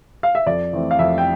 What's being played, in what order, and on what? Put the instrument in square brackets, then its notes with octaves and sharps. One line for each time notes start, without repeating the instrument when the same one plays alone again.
[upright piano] F5
E5
F2 D5
E3 A3 C4
F5
F2 E5
G5